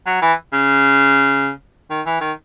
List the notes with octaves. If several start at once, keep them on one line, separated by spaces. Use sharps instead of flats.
F#3
E3
C#3
D#3
E3
D#3